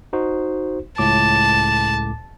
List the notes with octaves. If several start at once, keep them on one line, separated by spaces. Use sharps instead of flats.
D#4 F#4 C5
C#2 A2 A5 D6